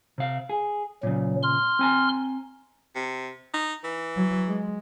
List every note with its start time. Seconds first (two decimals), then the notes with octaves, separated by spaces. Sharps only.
0.18 C3 F5
0.49 G#4
1.03 A#2 C#3 F#3
1.43 C6 F6
1.79 C4 G#5 A#5
2.95 C3
3.54 D#4
3.84 E3
4.17 F#3
4.48 G#3